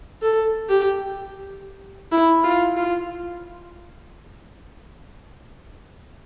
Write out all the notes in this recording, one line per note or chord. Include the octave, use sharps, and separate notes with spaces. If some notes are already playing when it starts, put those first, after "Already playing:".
A4
G4
E4
F4
F4